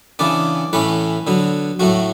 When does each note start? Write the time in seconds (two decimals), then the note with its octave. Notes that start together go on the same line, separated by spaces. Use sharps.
0.19 C#3 E3 B3 D4 D5
0.73 A2 E3 A3 C#4 B4
1.27 D3 F#3 B3
1.80 A2 F#3 A3 F#4